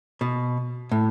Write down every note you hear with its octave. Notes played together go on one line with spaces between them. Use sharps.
B2
A2